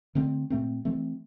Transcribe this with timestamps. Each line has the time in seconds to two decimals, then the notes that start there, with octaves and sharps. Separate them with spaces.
0.15 D3 A3 C4
0.50 A#2 A3 C4
0.85 E3 A3 C4